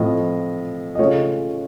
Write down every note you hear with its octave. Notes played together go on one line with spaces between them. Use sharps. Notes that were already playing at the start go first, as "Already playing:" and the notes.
Already playing: A2 F3 C4 F4 D#5
D#5
C#3 A3 C#4 F4 C#5